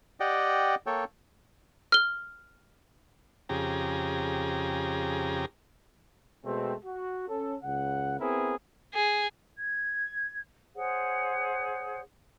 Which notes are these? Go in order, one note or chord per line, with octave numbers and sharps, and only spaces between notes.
G4 D5 D#5 F#5 G5
A#3 A4 C#5 G5
F6 G7
F2 C#3 G4 G#4 A#5
B2 G#3 A3 C4
F#4
C#4 A4
C#2 C#3 F#5
B3 C4 E4 G#4 A#4
G#4
G#6
G#4 C5 C#5 F#5